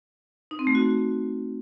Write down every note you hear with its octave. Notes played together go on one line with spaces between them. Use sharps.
D#4
C4
A3
F#4